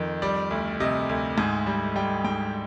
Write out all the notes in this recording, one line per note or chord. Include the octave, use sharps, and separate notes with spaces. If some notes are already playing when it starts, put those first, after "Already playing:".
Already playing: F2 D#3
G3 D5
D2
C3 D#5
D2
G#2
G3
G3 G5
G#2 G5